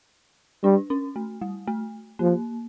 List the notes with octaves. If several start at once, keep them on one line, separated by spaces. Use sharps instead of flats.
G3 D4
C#4
A3
G3
A3
F3 A#3